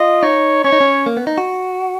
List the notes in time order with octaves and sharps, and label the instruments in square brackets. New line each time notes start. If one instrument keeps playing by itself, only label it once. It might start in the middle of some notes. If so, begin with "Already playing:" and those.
Already playing: [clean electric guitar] F4 [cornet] D#5
[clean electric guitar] D#4 [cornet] C#5
[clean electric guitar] C#4 [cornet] C#5
[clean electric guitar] D#4
C#4
A#3
B3
D#4
F#4